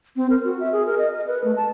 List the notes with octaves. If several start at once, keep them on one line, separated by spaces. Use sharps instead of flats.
C4
A#4
F#4
E5
G#4
A#4
D#5
D#5
B4
A3
A5